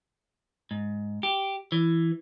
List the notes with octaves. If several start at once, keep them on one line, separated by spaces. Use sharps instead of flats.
G#2
G4
E3